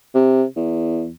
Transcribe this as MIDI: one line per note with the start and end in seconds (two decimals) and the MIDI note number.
0.14 0.44 48
0.56 1.10 40